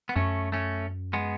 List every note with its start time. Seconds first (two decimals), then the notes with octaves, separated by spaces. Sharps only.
0.09 B3
0.16 F#2 A3 C#4
0.52 A3 C#4
1.13 G#3 B3